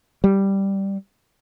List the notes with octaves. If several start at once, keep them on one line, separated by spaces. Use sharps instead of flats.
G3